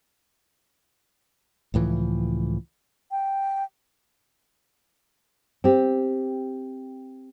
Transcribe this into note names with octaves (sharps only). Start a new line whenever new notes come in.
C#2 A2 E3 F3
G5
C4 G4